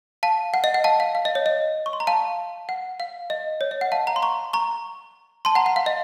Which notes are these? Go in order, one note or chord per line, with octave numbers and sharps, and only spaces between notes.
F5 A5
F#5
D#5
F#5
F5 A5
F5
F5
D#5
C#5
D#5
C#6
C6
A#5
F5 A5
F#5
F5
D#5
C#5
D#5
F#5
F5 A5
F#5 A#5
C6
A#5 C#6
A#5 C#6
A5 C6
F#5 A#5
F#5
F5
D#5